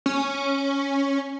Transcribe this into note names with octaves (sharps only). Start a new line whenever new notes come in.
C#4